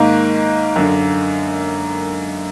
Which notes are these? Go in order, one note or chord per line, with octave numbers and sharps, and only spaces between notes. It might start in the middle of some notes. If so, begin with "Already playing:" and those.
Already playing: G#2 D#3 A#3
F#2 D3